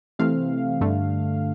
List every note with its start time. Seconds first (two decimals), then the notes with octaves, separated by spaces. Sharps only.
0.19 C3 E3 A3 C4 F5
0.81 G2 D3 A3